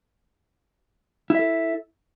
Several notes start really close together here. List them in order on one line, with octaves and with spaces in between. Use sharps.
E4 E5 A4